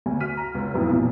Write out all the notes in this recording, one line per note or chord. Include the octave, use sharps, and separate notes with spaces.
D2 G#5
F#4 F6 B6 D#7
A#5
C#2
F2 A2 E3 F#3 B3 D#4
B1 E2 A#2 F3